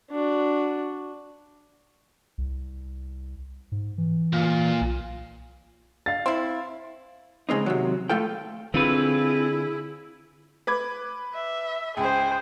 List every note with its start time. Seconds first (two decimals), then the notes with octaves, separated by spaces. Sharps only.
0.11 D4 F#4
2.38 C2
3.72 G#2
3.98 E3
4.33 A#2 F4
4.81 B1
6.06 F5 A6
6.26 C4 E4
7.49 C#3 G#3 C4 D#4
7.66 C3 D#3 F#3
8.09 A3 F4 A4 G5
8.74 D3 C4 E4 F4 G#4 B4
10.67 B4 D6 G#6
11.35 E5
11.97 C#2 G#4 C5 G5